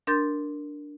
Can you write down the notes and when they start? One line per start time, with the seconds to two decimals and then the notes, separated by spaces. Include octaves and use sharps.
0.07 D4 A#4 C6 G6 A6